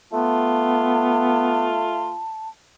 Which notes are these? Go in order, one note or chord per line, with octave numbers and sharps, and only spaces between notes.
A3 B3 F4 A5